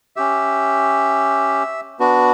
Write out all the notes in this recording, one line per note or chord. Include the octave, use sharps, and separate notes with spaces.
C#4 G4 E5
B3 D4 F#4